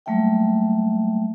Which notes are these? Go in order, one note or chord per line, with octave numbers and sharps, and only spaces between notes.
F#3 G3 A3 A#3 E5 G5